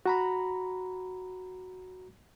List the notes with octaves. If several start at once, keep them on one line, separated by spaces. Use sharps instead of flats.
F#4 A#5 B5